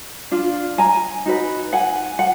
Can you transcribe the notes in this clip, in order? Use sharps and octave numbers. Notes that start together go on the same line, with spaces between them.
D4 F4
G#5 A#5
D#4 F#4 B4
F#5 G#5
F#5